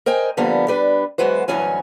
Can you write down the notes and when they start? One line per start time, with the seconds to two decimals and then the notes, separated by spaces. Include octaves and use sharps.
0.06 A#4 C5 D#5 G5 G#5
0.37 D3 F3 G3 A#3 B3
0.68 G3 D4 B4
1.18 E2 F#3 G#3 F#4 B4 C5
1.48 D2 G2 E3 F#3 C#4 G#5